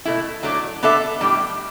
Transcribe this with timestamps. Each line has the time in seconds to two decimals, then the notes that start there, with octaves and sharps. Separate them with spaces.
0.05 B2 A3 E4
0.43 F#3 A3 D4
0.83 B3 D4 A4 E5
1.21 A2 G3 D4 G4